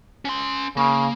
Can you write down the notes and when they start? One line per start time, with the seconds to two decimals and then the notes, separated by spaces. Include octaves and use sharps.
0.25 C#4 C6
0.77 C#3 A#3